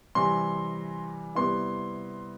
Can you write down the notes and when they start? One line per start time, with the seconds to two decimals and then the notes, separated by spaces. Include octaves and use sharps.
0.15 C3 E3 G3 C6
1.35 C3 G3 B3 E4 C6